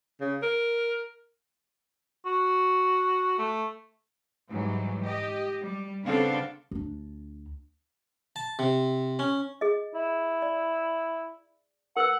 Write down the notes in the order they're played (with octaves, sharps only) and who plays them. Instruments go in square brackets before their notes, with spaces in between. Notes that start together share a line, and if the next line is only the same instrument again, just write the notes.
[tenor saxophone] C#3
A#4
[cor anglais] F#4
A3
[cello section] G#2 E3 F#3 G3
G4 D#5
G3
C#3 B3 C4 D4 A4 F5
[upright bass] D2 D4
[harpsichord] A5
C3
C#4
[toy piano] G#4 D#5
[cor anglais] E4
[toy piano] D5
[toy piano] A#4 B4 E6 [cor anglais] F#5